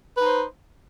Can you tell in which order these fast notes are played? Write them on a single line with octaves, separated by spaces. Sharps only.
B4 D#4 C5